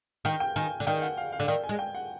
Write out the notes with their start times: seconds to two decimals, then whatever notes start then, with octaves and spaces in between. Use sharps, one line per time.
0.25 D#3 G5
0.40 G5
0.56 D#3 G#5
0.80 D3
0.87 D#3 G5
1.02 F#5
1.17 F5
1.32 F5
1.40 D3
1.48 D#3 G5
1.64 G#5
1.69 G#3
1.79 G5
1.95 F#5